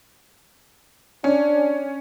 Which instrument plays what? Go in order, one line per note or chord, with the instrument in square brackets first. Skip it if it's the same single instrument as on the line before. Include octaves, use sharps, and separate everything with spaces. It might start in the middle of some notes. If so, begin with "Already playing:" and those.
[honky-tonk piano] C#4 [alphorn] D4